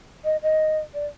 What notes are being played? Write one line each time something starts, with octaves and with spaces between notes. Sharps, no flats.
D#5
D#5
D5